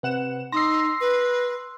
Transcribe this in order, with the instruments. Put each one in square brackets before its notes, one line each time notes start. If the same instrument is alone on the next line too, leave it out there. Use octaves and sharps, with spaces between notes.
[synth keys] C3 F#5 E7 [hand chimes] B4
[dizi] D#4 [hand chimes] C6 D#6 E6 [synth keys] A#6 C7
[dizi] B4